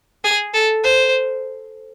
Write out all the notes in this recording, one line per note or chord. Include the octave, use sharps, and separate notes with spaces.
G#4
A4
C5